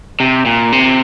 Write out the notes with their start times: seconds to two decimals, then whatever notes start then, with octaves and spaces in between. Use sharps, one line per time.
0.20 C3
0.46 A#2
0.72 C3